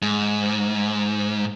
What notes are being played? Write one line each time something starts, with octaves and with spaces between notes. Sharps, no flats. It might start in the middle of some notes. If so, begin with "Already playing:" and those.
G#2